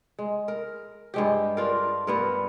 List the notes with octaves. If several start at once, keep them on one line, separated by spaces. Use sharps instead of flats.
G#3
A#4
G2 G#3 G4
D4 F4 A#4
G2 B3 A#4